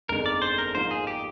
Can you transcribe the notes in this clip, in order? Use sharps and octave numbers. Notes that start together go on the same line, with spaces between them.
G1 F2 D3 G#3 D#4 A#4
D5
C5
A#4
G#2 F3 A#3 C5
G#4
G4